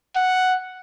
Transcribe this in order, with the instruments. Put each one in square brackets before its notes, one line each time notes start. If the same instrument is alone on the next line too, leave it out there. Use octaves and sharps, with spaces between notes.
[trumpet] F#5